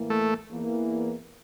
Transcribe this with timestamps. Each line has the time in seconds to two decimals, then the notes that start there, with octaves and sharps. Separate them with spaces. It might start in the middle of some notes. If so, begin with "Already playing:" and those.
Already playing: A2 E3 A#3
0.10 A3
0.51 E2 E3 A#3